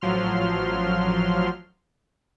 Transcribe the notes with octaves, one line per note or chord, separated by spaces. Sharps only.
A1 F3 F#3 C6 F6